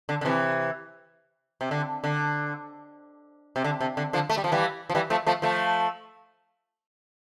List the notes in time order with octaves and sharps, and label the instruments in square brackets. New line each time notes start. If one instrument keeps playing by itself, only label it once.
[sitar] D3
D3
C3 E3
C3
D3
D3
C3
D3
C3
D3
D3 F3
A3
G3
F3
E3 G3
F3
E3 G3
F3 A3
F3 A3
F3 A3